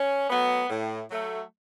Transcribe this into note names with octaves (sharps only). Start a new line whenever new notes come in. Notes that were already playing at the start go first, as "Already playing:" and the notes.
Already playing: C#4
F#3 A3 B3
A2
F#3 A3